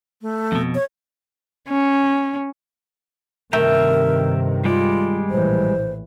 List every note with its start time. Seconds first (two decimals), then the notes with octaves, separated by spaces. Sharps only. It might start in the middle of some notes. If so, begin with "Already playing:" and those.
0.22 A3
0.52 F2 B2
0.75 C#5
1.69 C#4
3.53 G2 C3 D#3 A3 A#4 E5 G5 A#5
4.65 G3 G#3 F4 D5
5.30 A#1 A2 E3 C5